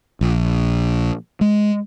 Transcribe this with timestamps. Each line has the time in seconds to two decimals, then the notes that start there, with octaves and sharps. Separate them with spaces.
0.21 A#1
1.41 G#3